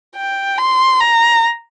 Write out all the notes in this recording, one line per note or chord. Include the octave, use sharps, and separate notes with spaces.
G5
C6
A#5